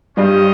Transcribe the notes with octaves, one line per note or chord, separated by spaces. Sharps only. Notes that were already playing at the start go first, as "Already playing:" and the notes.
G2 G3 C#4 F4 C5 D#5 G5